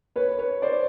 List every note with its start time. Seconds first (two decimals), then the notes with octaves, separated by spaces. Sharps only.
0.16 B4 C#5
0.39 B4 C#5
0.62 C5 D5